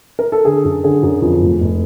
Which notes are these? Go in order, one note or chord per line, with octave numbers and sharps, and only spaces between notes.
A#4
A4
D3 G#4
F#2
D3 G#4
F#2
F2
F1
F1